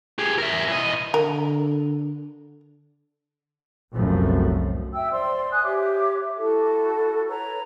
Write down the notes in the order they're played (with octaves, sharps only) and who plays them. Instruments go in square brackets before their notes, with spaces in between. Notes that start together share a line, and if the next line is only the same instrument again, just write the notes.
[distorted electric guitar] G4 G#4
A#4 E5
E3 D#5
[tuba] D3 [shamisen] A#4
[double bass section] F1 C2 F#2 A2 F3 A3
[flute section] E5 G5 E6
C5 D5 C6
G#5 D#6 F#6
G4 C#5 E5 D6
E4 F#4 A4
B4 C#5 A#5